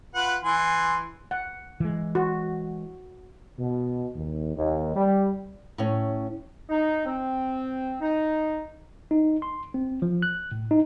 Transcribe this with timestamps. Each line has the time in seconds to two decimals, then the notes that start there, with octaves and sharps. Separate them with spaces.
0.15 F4 B4 F#5
0.44 E3 G#5 C6
1.31 F#5
1.80 E3 G#3
2.15 F#4
3.59 B2
4.16 D#2
4.56 D#2
4.96 G3
5.78 A2 C#4
6.69 D#4
7.05 C4
8.01 D#4
9.11 D#4
9.42 C6
9.74 C4
10.02 F3
10.22 F#6
10.52 A2
10.71 D#4